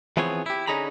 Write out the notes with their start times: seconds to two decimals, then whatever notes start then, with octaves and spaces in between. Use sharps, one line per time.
0.17 E3 F3 B3 C4 G#4 C#5
0.46 E4 G4
0.67 D3 C#4 D#4 G#4 A#5 B5